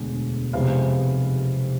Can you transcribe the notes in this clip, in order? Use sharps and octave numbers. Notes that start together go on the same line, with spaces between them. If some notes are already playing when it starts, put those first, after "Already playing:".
Already playing: E1 D2 D3 G#3
F1 F2 C3 G#3 B3 F5